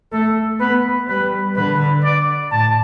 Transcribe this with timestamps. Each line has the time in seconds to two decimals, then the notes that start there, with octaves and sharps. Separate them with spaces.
0.12 A3 A4
0.60 B3 B4
1.08 G3 B4
1.56 D3 B4
2.03 D5
2.51 A2 A5